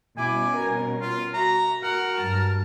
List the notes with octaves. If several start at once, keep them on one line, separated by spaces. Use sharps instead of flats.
B2 G3 C#4 E4 G#5 D6
A#4
F4
F#4 E5 A#5
F#4 A#4 F#5
G2 F#3 A5